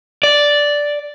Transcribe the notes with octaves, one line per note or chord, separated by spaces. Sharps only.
D5